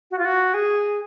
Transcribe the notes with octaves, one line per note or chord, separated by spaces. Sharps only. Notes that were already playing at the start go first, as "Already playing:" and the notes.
F#4
F4
F#4
G#4